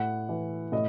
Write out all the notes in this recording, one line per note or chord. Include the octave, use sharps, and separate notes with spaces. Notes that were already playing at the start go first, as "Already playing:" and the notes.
Already playing: A2 F#5
E3
A2 D#5